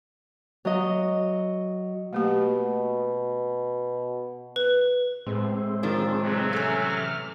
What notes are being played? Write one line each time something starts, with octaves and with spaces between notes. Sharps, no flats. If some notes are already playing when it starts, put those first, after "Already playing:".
F#3 D#5
B2 A3 A#3 G4
B4
A2 G#3 C4
D#3 F3 D4
C3 E3 F#3
A3 C#4 F6